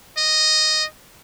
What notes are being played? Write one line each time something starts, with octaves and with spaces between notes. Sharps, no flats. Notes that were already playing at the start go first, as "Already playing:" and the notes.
D#5